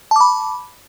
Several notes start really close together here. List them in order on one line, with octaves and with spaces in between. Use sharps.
A5 D6 B5